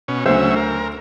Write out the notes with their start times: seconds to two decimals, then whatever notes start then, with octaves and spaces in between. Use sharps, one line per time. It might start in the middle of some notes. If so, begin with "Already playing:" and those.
0.08 B2 C#4
0.26 D2 C#3 F#3 C5 E5
0.56 A#4